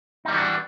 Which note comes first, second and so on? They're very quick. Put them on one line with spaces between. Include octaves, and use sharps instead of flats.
D#4 G3 E3 F#4 D4